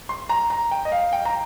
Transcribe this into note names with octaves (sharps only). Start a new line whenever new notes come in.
C6
A#5
A#5
G5
D#5
F5
G5
A#5